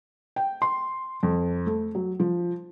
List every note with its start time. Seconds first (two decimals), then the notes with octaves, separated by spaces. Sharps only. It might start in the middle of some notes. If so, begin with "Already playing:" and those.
0.36 G5
0.62 C6
1.23 F2
1.66 A3
1.95 F#3
2.20 F3